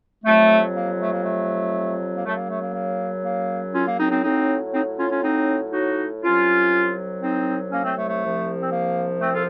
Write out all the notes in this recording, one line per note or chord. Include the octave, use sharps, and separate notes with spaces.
F2 C3 F#3 A3
A#3
A3
A#3
A3
A#3
F#2 C#3 F#3 A3
A#3
A3
A#3
A#3
A#3
C#4 F4
A#3
C4 D#4
C4 D#4
A2 F#3 C4 D#4
C4 D#4
C#4 F4
C#4 F4
C4 D#4
D#4 F#4
C2 C3 F#3 C#4 F4
C4 D#4
A#3 C#4
A3 C4
A3
A3
C2 C3 F3
C4
A#3
A3 C4
F4 A4